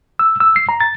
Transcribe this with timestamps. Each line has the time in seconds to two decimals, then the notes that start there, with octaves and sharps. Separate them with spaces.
0.19 E6
0.40 E6
0.56 C7
0.69 A#5
0.80 A6